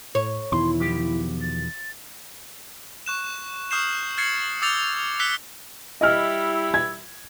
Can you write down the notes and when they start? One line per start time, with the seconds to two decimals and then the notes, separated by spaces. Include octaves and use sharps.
0.15 A2 C#5
0.52 E2 B2 D#3 E4 C6
0.80 F3 G4
1.41 A6
3.06 C#6 F#6 E7
3.71 C#6 D#6 F6 G6 C7 E7
4.18 F6 G#6 A6 C7 C#7 F#7
4.62 D6 E6 G6 A6 C#7 F7
5.19 E6 F#6 B6 C#7 G7
6.01 G3 E4 D#5 F6
6.74 G#6